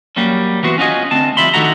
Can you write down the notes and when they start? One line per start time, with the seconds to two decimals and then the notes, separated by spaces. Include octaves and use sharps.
0.16 F#3 G3 A#3 C#4
0.63 E3 B3 F#4 C5
0.78 C#4 F4 F#4 D#5 G#5
1.11 D2 C4 A5
1.37 F3 G3 E5 B5 C6
1.54 D3 D#3 A3 E4 F#4 A#5